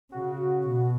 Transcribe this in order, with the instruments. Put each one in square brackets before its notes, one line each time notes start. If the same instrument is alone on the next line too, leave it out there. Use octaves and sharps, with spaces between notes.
[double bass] C#3 [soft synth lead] F#4
[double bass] B2